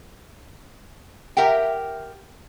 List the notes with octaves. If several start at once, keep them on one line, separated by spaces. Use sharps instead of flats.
G4 A#4 E5 F#5 G5